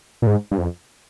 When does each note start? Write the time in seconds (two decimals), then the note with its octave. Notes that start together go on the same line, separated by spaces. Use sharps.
0.22 A#2
0.27 G#2
0.51 G2
0.58 F2